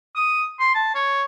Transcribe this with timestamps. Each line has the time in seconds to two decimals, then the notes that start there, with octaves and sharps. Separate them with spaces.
0.16 D#6
0.59 C6
0.75 A5
0.95 C#5